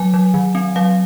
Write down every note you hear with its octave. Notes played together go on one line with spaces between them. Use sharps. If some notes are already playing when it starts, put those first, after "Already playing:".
Already playing: F#3 G#5
F#3
D#3
C4
F#3 F5